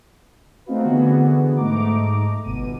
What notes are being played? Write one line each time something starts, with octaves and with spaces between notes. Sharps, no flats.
A3 C4 D#4 F4 F#4 B4
D3 E3 B3 F#4 G#4
G#2 A3 D#4 A#5 D6
G1 B2 D#7